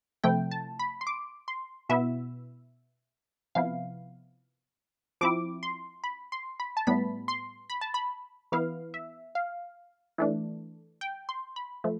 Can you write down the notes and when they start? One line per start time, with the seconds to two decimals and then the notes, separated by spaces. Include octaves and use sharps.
0.24 C3 F3 A3 E4 G5
0.51 A5
0.79 B5
1.01 C6
1.07 D6
1.48 C6
1.89 B2 B3 E4 E5
3.55 C3 F3 B3 E4 F5
5.21 F3 C4 E4 D6
5.63 C6
6.04 B5
6.32 C6
6.60 B5
6.77 A5
6.87 A2 G3 B3 E4 B5
7.28 C6
7.70 B5
7.81 A5
7.94 B5
8.52 E3 B3 E4 F5
8.94 E5
9.35 F5
10.18 E3 A3 D4
11.01 G5
11.29 C6
11.56 B5
11.84 F3 A3